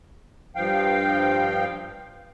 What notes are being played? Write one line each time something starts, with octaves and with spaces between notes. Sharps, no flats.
G2 F3 F5 G5